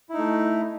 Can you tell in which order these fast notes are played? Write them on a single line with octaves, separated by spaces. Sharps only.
E4 D#4 A3